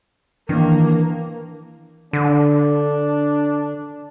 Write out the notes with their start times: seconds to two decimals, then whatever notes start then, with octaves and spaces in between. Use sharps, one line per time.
0.49 D#3 E3 A#3 D4
2.13 D3 D4